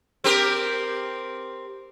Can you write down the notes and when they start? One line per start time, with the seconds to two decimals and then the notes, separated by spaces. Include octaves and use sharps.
0.24 C4 G4 A#4